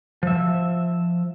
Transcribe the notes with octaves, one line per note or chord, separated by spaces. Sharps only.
F3 E5